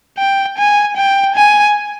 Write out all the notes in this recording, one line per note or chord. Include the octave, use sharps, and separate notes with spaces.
G5
G#5
G5
G#5